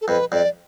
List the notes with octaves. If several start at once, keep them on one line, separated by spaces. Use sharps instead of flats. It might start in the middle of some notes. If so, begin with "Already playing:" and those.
A4
F2 B4
F2 D5